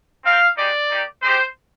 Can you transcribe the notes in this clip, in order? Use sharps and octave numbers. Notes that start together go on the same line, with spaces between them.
C4 D#4 G4 F5
G#3 D#4 G4 D5
A#3 D#4 G4
G#3 C4 G4 C5